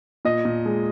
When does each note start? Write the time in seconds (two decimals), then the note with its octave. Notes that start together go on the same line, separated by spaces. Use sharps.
0.25 A#2 D#5
0.45 A#2
0.66 G#3